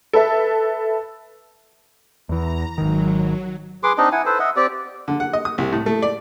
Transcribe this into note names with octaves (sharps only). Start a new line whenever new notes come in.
A4 B4 E5
E2 E3 A#5
G#1 D#3 F#3
G#4 B4 C6 D6
C4 D4 D#4 D#5
E4 F#5 G#5
A4 B4 C5
D#5 E5 F#5
C4 G4 D5
D3
F#5
D#5
D#6
C2
A2
A3
D5